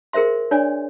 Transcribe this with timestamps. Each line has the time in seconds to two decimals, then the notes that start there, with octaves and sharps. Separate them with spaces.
0.13 G#4 A#4 C5 E5 C6
0.51 D4 C#5 D5 G#5